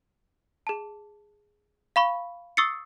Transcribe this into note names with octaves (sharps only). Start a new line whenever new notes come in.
G#4 A5
F5 B5 C#6
C#6 D#6 E6 A6 C7 C#7